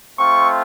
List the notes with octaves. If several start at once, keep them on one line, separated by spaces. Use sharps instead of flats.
A3 C4 F4 C#6